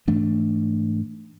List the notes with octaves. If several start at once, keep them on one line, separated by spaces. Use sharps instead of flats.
G#2 E3 A3 D4